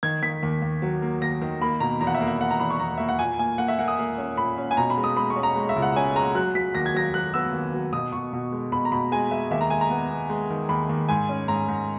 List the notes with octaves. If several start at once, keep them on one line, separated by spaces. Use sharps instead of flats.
D#3 G#6
D#3 B6
D#2
D#2
F#3
A#3
D#2 A#6
D#3
A#3 B5
B2 A#5
E2 A#5
F#5
E5
A#3
E5
A#3 F#5
A#5
E2 B5
C#6
E2 A#5
A#3 E5
F#5
A#2 G#5
A#3 G#5
A#3 F#5
E5
A#3 F#5
D#6
A#3
C#4
A#2 B5
C#4
G#5
B2 A#5
B5
G#3
D#6
G#3 B5
C#6
C#4
A#5
G#3
E5
C#2
F#5
C#4 G#5
G#3 A#5
F#3 F#6
F#3 B6
D#2 A#6
G#6
F#3 A#6
F#3 F#6
B3 E6
D#2
F#3
B2 D#6
B2 C#6
B2
G#3
B2 B5
A#5
B2 B5
G#3 G#5
G#3 E5
D#2 E5
A#5
G#3 G#5
A#5
B3
B3
G#3
D#3
D#2 B5
D#2
G#2 G#5
C#4
G#2 A#5
G#2